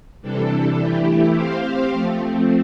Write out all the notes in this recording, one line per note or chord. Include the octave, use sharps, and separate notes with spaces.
C3 E3 G3 D4 A4
E3 A3 E4 G4
C4 G4 C5 F5
F3 A3 C4